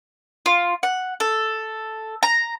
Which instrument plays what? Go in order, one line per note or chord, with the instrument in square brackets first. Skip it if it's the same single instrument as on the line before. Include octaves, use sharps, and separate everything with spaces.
[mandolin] F4
F#5
A4
A#5